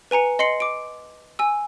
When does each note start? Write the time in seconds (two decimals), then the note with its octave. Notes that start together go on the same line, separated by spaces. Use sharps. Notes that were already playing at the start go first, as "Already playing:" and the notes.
0.11 B4 G#5 A#5 C#7
0.39 D#5 C6 C7 C#7 F#7
0.60 D6 D7
1.39 G#5 E6